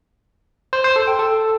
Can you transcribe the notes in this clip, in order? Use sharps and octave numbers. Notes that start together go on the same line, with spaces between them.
C5
C5
A4
G5
A4